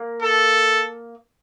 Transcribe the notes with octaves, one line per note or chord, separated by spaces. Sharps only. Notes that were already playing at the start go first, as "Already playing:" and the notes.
Already playing: A#3
A4